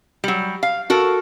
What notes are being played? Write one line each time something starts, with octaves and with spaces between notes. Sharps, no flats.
F#3 G3
F5
F#4 A4 A#4